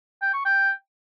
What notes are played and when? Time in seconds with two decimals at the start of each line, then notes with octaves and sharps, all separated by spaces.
0.22 G5
0.33 C#6
0.45 G5